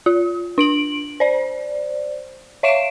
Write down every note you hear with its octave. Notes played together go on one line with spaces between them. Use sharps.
F4
D4 D7 F#7
C5 D5
C#5 E5 F5 C7 D7 E7